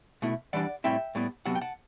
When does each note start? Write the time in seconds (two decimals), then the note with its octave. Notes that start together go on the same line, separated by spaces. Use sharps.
0.22 B2 A3 E4
0.53 E3 G3 D4 D5 F#5
0.84 A2 G3 C4 E4 E5 G5
1.15 A2 G3 B3
1.46 C3 F#3 B3 F#5 A5
1.55 G5
1.61 F#5 A5